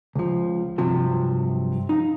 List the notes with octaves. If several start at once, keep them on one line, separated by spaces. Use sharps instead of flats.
C#2 F3
G2 C3 F3 F#3
D#4 F5